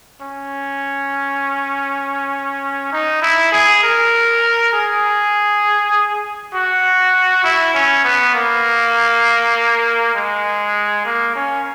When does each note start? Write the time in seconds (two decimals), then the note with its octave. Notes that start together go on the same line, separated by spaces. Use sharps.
0.21 C#4
2.92 D#4
3.22 E4
3.52 G#4
3.83 A#4
4.73 G#4
6.54 F#4
7.44 E4
7.74 C#4
8.04 B3
8.35 A#3
10.15 G#3
11.05 A#3
11.35 C#4